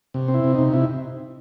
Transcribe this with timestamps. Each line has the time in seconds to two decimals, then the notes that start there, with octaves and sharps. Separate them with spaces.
0.14 C3
0.28 C4
0.34 E4
0.44 C3
0.55 C3 D#4
0.74 C3 E4